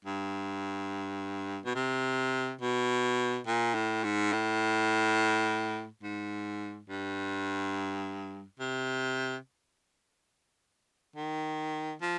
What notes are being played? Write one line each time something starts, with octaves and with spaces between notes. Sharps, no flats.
G2
B2
C3
B2
A#2
A2
G#2
A2
G#2
G2
C3
D#3
F3